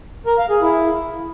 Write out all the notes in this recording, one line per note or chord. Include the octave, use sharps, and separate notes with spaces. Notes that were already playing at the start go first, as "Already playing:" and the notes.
A#4
F5
G#4
E4